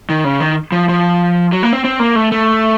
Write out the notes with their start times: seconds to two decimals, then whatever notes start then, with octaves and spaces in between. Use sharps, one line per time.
0.10 D#3
0.24 C#3
0.40 D#3
0.72 F3
0.89 F3
1.52 F#3
1.63 A#3
1.73 C4
1.84 C4
2.00 A#3
2.16 A3
2.32 A3